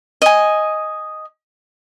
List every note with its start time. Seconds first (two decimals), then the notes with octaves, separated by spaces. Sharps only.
0.22 D#5 G#5